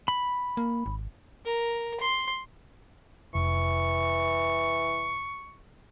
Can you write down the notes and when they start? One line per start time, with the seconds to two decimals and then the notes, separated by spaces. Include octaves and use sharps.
0.08 B5
0.57 A#3
0.86 G#1
1.45 A#4
2.00 C6
3.35 F1 E3 C#6